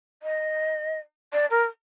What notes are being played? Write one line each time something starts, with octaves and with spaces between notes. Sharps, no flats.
D#5
D5
A#4